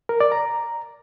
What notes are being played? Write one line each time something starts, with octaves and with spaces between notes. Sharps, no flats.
A#4
D5
A#5